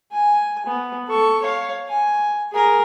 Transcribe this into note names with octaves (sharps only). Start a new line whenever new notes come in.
G#5
B3
A4 C#6
C#5 F5
G#5
G#4 A#4